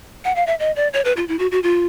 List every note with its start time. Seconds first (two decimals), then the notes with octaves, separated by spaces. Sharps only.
0.25 F#5
0.36 F5
0.47 E5
0.59 D#5
0.76 D5
0.93 C#5
1.05 B4
1.17 F4
1.28 E4
1.39 F#4
1.52 F#4
1.63 F4